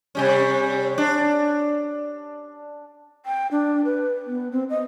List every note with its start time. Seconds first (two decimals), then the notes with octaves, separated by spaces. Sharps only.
0.15 C3 G3 C#4
0.98 D4
3.26 G5
3.51 D4
3.85 B4
4.27 B3
4.52 C4
4.69 D#5